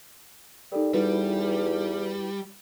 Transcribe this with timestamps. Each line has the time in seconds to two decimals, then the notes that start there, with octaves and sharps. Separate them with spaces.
0.72 G3 D#4 A4 A#4
0.94 E2 G3 E4 F#4 B4